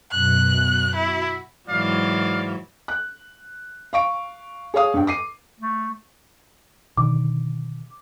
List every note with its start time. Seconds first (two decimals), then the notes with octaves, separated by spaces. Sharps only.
0.11 F#2 B2 F#6
0.95 E4 F#4
1.69 G#2 E3 F#3 D5 F5
2.88 F#6
3.93 F5 C#6 D7
4.74 G#4 C#5 F5 D#6
4.94 G2 G5
5.07 D6 C7 D#7
5.60 A3
6.97 B2 D3 D#3 D6